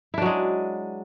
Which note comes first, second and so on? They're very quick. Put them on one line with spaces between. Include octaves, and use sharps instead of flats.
E4 D4 F#3 G#3